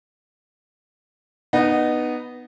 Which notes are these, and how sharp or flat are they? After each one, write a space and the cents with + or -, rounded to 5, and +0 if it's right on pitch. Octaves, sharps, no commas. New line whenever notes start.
B3 +0 D#4 -20